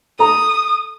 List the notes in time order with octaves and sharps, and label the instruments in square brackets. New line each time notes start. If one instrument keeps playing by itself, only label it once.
[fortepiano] A4 A#5 [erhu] D#6